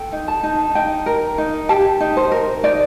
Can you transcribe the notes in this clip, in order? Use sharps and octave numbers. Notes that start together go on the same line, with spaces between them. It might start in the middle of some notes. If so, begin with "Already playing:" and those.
Already playing: A4 G5
D#4
A5
D#4
D#4 G5
A#4
D#4
G4 A5
D#4
C5
A#4
D#4 D5